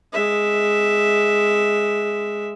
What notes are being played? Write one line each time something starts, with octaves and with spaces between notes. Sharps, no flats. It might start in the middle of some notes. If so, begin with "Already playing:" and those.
G#3 E5